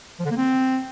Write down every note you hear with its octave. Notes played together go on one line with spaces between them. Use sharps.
F3
D3
A#3
C4